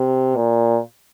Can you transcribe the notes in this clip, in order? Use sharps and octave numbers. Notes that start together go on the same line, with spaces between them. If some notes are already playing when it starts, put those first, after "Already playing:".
Already playing: C3
A#2